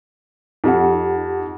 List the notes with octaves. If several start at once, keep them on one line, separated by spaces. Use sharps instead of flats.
F2 D#4 G4 F#5